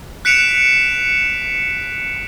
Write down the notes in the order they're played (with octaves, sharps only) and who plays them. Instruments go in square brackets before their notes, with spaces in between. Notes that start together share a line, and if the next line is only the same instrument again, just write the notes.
[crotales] F#6 B6 C#7 D7 E7 F7